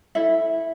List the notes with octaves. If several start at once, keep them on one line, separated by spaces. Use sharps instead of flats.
E4 A4 E5